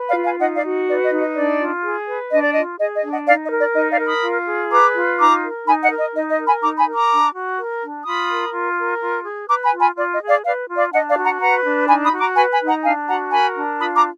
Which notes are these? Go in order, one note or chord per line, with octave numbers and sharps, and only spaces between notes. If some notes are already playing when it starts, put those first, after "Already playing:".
Already playing: B4
D5 F5
F4
F5 G#5
D#4 D#5 F#5
D5 F5
F#4
B4 D5
D#5
D#4
D#5
D4 D5
F4
G#4
B4
D4 D#5
D5
F4 D#5
G#4 D#5
D#5
D4
D#5 F#5
D#4 D5 F5
D#5
A#4
D5
D#4 D#5
D5 F5
A#4
B5 D#6
F4
G#4
B4 A#5 D6
F4
D#4 A#5 D6
A#4
D#4 G#5 B5
D#5 F#5
A#4
D#5
D#4 D#5
D#5
A#4
G#5 B5
D#4 A#5 D6
G#5 B5
A#4
A#5 D6
D4
F#4
A#4
D4
F4 B5 D#6
A#4
F4
A#4
F4
G#4
B4 A#5 D6
G#5 B5
F4
G#5 B5
F4 D5
D#5
G#4
D5 F5
B4 D5 F5
F4
D5 F5
D4 D#5 F#5
D5 F5
F#4
F#5 A#5
B4 F#5 A#5
D4
D#4 G#5 B5
B5 D#6
F#4
A#5 D6
B4 G#5 B5
G#5 B5
D#4
F#5 A#5
D4 F5 G#5
F#4 F#5 A#5
A#4 G#5 B5
D4
F4 B5 D#6
A#5 D6